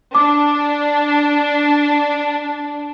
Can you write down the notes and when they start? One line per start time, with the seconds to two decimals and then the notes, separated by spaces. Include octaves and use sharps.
0.15 D4 D6